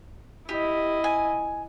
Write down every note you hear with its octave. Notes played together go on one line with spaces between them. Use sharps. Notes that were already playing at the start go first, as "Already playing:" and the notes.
E4 G4 D#5
G#5